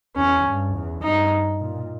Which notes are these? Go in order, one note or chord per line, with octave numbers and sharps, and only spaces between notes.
E2 C#4
G2
E2
G2 D#4
A#2